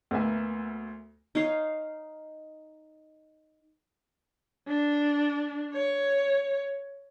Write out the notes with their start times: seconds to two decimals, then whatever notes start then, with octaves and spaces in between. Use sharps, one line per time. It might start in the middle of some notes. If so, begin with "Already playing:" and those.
0.11 D2 A#3 B3 E5 G#5
1.35 D#4 C#5 F5
4.68 D4
5.73 C#5